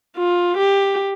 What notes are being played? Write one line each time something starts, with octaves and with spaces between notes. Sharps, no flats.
F4
G4